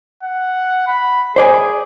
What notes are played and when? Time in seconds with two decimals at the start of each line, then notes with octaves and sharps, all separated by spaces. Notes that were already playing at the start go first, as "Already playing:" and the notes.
0.23 F#5
0.87 B5
1.36 G#4 C5 D5 G#5